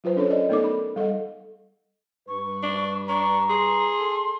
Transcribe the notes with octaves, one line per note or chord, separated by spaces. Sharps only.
F#3 F4 B4 C5
C#4 D4 A4 A#4 C5 C#5
C5 D5 D#5
A3 B3 D#4 A4 A#4 D6
B5
G3 A4 D#5 F#5
G2 B4 C#6
D4
D4 A#5 C#6
G#4 C6
A4